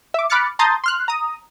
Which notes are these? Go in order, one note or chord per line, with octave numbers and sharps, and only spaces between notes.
E5 D6
B5 D6 F6 F#6 A6 C#7
A5 A#5 C6 D#6 G6 A6
C6 F6 F#6
A#5 D#6